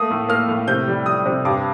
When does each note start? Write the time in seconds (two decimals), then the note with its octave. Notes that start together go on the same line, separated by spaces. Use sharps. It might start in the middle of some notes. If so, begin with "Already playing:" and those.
Already playing: A3 A#3 D#6
0.10 A2
0.29 A#3 F6
0.49 A2
0.68 C3 G6
0.88 G3
1.06 G3 D#6
1.25 C3
1.45 G2 D6